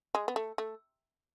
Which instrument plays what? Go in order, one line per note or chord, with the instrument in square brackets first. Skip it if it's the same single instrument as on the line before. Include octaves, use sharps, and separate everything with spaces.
[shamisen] G#3
B3
A3
A3